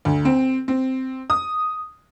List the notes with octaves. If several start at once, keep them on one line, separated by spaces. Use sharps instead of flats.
D2
C4
C4
D#6